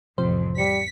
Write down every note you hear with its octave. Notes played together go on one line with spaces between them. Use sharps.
A1 F2 C3 F3 C5
G3 B6 C#7